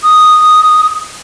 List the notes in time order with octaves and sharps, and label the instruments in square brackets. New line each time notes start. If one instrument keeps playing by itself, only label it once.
[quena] D#6